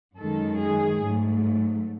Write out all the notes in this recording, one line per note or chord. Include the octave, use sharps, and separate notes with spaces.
F#2 D#3 G#3 A4
G#4
G#2 F#3 A3